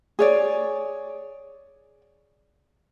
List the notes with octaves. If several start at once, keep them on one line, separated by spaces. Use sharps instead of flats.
G#4 C#5 D5